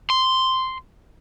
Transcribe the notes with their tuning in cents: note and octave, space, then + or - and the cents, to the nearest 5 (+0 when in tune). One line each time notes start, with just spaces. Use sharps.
C6 -5